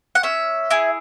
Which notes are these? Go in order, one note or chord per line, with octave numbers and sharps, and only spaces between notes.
F#5
C#4 E5
E4 G#4